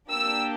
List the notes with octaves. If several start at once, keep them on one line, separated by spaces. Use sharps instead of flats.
A#3 D4 G4 E6